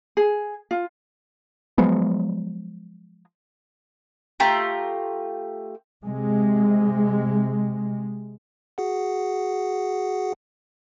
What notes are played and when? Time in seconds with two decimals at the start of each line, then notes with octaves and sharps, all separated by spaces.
0.17 G#4
0.71 F4
1.78 F3 F#3 G#3 B3
4.40 A3 F4 G4 A#5
6.04 C3 G#3
8.78 F#4 G#4 F#5